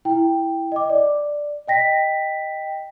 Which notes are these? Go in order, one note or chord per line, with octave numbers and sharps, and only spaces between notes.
E4 G5
D#5 D6
D5
D#5 G5 A#6 B6